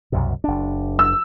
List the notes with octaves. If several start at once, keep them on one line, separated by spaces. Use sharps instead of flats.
C2 F#2 B2
F#1 D4
E6